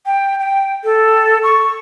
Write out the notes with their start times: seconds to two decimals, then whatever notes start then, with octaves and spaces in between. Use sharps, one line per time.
0.06 G5
0.40 G5
0.84 A4
1.43 C#6